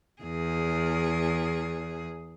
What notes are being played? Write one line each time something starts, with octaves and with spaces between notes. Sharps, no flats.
E2 G#4